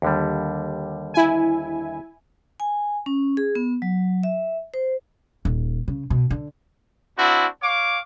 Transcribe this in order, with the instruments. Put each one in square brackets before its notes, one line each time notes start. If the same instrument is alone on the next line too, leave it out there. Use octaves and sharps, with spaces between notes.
[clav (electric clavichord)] D#2 D3 G3
[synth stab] E4 G#5
[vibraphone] G#5
C#4
G#4
B3
F#3
E5
C5
[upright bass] D#1
C#3
B2
D3
[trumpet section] C4 D4 E4 F#4
C#5 F5 D6